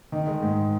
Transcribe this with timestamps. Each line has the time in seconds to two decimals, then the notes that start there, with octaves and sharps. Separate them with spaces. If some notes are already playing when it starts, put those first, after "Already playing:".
0.12 D#3
0.27 G#3
0.42 G#2